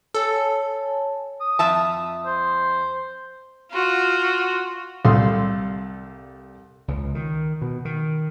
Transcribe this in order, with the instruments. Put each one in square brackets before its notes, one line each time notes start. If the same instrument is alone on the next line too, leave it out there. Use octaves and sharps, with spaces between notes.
[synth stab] A4 [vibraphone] C#5 G#5 A5
[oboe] D#6
[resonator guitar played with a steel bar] F2 E5 A5
[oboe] C5
[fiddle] F4 F#4
[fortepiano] C2 G3 A4 F5 C6 D#6
[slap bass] C#2
D#3
B2
D#3